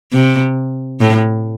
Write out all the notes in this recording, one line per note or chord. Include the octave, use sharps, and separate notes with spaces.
C3
A2